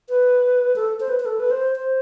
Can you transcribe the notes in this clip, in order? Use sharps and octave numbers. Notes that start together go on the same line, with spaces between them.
B4
A4
C5
B4
B4
A4
B4
C5
C5